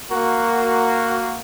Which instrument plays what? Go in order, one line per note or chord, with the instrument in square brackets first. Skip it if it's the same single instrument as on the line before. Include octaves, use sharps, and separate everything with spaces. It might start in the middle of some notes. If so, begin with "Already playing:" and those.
[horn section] A#3 F#4